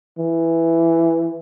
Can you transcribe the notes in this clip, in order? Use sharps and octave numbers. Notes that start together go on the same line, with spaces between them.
E3